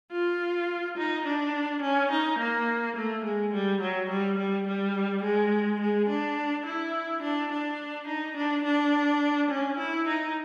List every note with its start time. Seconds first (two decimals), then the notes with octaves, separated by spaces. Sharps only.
0.12 F4
0.97 D#4
1.26 D4
1.82 C#4
2.11 D#4
2.39 A#3
2.96 A3
3.24 G#3
3.53 G3
3.81 F#3
4.10 G3
4.38 G3
4.67 G3
5.24 G#3
5.80 G#3
6.09 D4
6.66 E4
7.22 D4
7.51 D4
8.08 D#4
8.37 D4
8.64 D4
9.51 C#4
9.78 E4
10.07 D#4